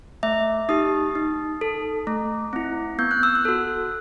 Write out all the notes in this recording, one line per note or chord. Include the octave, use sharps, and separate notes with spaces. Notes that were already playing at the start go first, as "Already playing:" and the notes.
A3 E5
D#4 G4 D#6
D#4
A4
A3
C4 E4
B3 G6
F#6
E6
F#6
F#4 A4